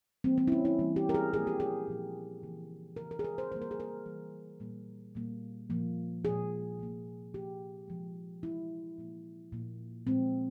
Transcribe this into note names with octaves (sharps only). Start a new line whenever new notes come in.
E3 G3 A#3 C4
C4
E4
C#4
E4
E3 G3 A#3
G4
A#4
G#4
A#2 F3 A#3 G#4
G4
G#4
A#2 F3 A#3
C#3 E3 A#3
C#3 E3 A#3 A#4
A#4
G#4
A#4
C5
E3 G3 A#3 C5
A#4
G#4
A#4
E3 G3 A#3
A#2 G3 A#3
A#2 G3 A#3
A#2 F3 A#3
A#2 F3 A#3 G#4
C3 F3 A#3
C3 F3 A#3 G4
C3 F3 G#3
C3 F3 G#3 E4
A#2 F3 A#3
A#2 F3 A#3
A#2 F3 G#3 C4